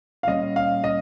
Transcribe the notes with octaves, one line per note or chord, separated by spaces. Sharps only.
F5
A#2 G3 C#4 D#5
F5
D#5